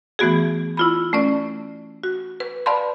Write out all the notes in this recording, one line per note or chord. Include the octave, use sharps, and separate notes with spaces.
E3 A3 B3 F#4 G#4
E4 F4 B5
A3 C#4 D5
F#4
B4
B4 D5 F5 A5 B5 C6